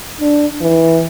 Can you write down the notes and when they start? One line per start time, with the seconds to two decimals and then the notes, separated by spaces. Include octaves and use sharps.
0.21 D4
0.61 E3